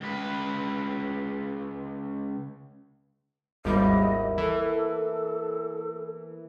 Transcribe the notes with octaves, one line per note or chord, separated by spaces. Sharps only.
C#2 B4
G#1 D#2 G3 A#3 B3 E4 D#5
E3 A4